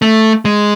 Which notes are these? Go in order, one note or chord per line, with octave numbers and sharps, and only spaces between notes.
A3
G#3